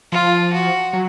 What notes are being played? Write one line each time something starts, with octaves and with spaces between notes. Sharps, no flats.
F3 F4
F#4
F#3